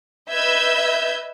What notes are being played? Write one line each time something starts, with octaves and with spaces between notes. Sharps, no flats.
B4 D#5 E5 E6 G6 G#6